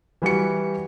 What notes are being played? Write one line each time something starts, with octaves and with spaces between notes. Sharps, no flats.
E3 G3 F#4 C#7